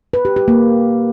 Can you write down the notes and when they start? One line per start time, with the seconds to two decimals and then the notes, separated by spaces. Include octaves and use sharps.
0.13 B4
0.25 G4
0.36 G4
0.48 A#3